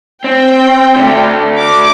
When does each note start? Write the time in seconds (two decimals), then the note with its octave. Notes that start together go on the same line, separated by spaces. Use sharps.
0.24 C4 G5
0.96 D3 A3
1.60 D6